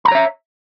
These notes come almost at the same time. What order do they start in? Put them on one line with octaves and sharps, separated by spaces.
B5 A#5 C#5 E5